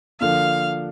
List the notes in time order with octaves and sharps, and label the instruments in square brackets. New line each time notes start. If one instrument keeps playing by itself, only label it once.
[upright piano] D3 F3 A#3 D4 [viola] F5